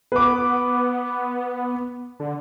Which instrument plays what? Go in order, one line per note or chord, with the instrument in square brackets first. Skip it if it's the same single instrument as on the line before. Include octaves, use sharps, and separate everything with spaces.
[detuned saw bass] B3 [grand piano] B4 D6
[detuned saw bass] D3